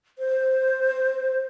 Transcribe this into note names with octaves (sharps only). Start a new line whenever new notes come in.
C5